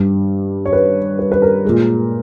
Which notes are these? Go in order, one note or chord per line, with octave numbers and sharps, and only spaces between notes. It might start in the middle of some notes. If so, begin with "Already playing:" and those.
Already playing: G2 G3
C#5
B4
B4
B4
A#4
A#2 G#3